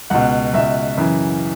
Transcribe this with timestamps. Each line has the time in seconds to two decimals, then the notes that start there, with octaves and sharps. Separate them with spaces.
0.10 C#2 B2 F#5
0.53 C#2 B2 E5
0.97 F#2 C#3 E3